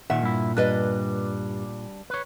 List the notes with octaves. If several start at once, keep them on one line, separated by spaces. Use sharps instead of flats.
A#2 D#3 E5 F#5
G2 E4
G2 G3 D4 B4 D#5
B4 C#5